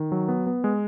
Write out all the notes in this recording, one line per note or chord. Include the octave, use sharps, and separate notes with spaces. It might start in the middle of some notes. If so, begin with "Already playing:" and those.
Already playing: D#3
F#3
B3
B3
G#3